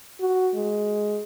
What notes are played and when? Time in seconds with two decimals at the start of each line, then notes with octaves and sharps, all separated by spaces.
0.20 F#4
0.55 G#3